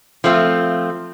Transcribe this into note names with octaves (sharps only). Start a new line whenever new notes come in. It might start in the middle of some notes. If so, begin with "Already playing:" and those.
F3 A3 C4 F4